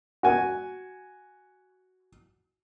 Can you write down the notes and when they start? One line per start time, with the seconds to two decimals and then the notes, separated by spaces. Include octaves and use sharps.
0.23 F#4 G#5